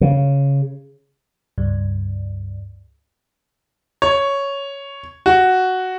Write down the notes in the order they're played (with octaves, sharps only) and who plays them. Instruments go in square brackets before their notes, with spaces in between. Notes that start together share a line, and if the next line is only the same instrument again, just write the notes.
[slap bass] C#3
[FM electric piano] C#2 G2
[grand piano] C#5
F#4